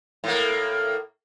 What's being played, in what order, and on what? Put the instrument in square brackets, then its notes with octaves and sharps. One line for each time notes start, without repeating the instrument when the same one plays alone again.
[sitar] A2 A#3